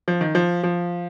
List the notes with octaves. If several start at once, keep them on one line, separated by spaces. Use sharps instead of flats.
F3
D#3
F3
F3